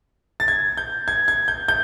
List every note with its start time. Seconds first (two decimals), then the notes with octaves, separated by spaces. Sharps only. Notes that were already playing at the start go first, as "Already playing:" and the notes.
0.40 A6
0.48 G#6
0.77 G6
1.08 G#6
1.28 G#6
1.48 G6
1.68 G6